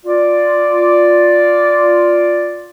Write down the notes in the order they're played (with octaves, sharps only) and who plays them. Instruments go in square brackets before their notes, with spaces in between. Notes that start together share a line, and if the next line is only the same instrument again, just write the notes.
[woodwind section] F4 D5